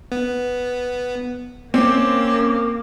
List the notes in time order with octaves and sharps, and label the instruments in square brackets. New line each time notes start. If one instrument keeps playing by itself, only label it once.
[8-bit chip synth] B3
[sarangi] A#3 [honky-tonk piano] C4 [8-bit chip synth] C#4 [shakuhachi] D6